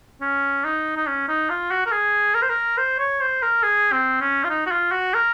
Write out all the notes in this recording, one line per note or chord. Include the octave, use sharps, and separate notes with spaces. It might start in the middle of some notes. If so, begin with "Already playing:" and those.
C#4
D#4
D#4
C#4
D#4
F4
F#4
A#4
G#4
A#4
C5
A#4
C5
C#5
C5
A#4
G#4
C4
C#4
F4
D#4
F#4
F4
F#4
A#4